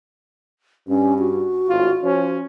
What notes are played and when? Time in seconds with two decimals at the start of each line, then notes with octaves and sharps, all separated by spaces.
0.88 G2 C#4
1.19 F#4
1.69 G#1 A2 F4
2.04 F3 C#4